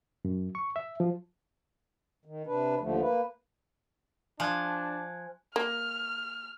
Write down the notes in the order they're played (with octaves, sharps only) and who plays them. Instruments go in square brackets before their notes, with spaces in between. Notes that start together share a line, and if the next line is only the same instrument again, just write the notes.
[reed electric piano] F#2
C#6
E5
F3
[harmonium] D#3
C3 D4 B4
D#2 D3 F3 A3
A#3 B4
[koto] F3 [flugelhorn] D4 [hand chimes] G#5 F#6 G#6
[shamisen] A#3 [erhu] F6